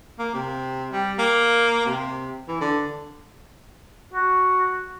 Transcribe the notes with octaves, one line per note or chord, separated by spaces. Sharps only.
A#3
C3
G3
A#3
C3
E3
D3
F#4